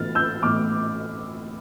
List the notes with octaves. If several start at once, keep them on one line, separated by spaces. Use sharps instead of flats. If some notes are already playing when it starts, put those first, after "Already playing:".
Already playing: A2 E3 B3 F6 A6
E6 G6
A2 E3 B3 D6 F6